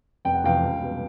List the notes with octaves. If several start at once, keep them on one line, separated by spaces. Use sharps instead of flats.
F1 G5
F#5
F2 C3 E3 F5 G5
C#2
B2 G3